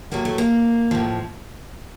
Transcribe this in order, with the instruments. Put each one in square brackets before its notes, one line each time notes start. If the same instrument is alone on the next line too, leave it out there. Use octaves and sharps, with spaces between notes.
[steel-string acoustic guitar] A2 F#3 A#3
A3
A#3
A2 F3